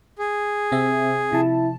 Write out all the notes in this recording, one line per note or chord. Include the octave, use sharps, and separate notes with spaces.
G#4
C3 C4 E5
C3 F3 E4 A5